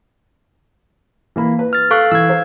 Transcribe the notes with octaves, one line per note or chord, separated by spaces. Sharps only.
E3 A#3 B5
B4
F6 A6
A4 F5 C#6 F#6
E3 E6 G#6
C5 F5